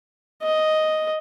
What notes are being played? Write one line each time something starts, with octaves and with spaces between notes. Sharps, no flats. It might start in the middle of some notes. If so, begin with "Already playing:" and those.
D#5